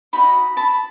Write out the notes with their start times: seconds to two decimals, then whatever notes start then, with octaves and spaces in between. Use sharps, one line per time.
0.13 D#4 F#4 D#5 B5
0.57 A5 B5